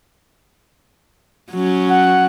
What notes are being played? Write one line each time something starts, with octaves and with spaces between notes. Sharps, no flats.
F#3 C#4
F#5